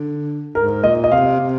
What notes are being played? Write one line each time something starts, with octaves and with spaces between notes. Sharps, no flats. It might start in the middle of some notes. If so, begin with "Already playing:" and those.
Already playing: D3
G#2 A#4
A#2 D#5
D#5
C3 F5
C3